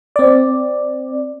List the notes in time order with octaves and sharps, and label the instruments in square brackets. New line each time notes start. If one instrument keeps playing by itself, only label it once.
[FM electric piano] C4 D5